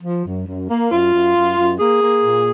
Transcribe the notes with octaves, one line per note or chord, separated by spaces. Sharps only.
F3
F#2
F#2
A#3
F#2 F4
F#2
F#2
F#2
A#3 G#4
A#3
A#2